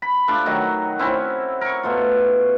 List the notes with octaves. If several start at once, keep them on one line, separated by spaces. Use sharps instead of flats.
B5
A3 D4 F4 D5
D#3 F#3 D#4 F#4
C4 C#4 E4
A#4 C#6
B2 A3 F4